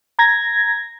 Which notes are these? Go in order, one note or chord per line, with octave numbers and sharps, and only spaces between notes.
A#5 G#6 A#6